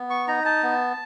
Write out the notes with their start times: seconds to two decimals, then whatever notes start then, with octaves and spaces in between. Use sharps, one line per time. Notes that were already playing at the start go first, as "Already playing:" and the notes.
Already playing: B3
0.10 C#6
0.28 D#4 A#5
0.45 A5
0.63 B3